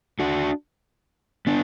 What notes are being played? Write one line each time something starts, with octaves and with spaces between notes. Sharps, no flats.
D4 F#4
B3 D4